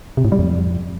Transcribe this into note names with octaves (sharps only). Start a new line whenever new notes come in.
C3
A2
G3
F2